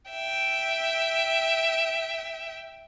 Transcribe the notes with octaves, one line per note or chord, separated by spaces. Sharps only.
E5 G5